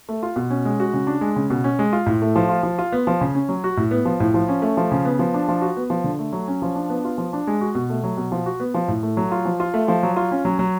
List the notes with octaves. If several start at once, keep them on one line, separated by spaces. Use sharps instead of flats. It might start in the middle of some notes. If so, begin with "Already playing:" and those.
A3
F4
B2
C#4
G#3
F#4
C#3
D4
G#3
C#3
B2
C#4
G#3
F4
A2
A3
F3
F4
F3
F4
B3
F3
C#3
C#4
F#3
F#4
A2
B3
F3
A2
F3
C#4
A3
F3
C#3
B3
F3
D4
F3
F#4
B3
F3
D3
A3
F#3
C#4
F3
D4
B3
F4
F3
D4
G#3
F#4
B2
A3
F#3
B2
F3
F#4
B3
F3
A2
A3
F#3
F4
F3
F4
A3
F3
F#3
F4
C#4
F#3
F#3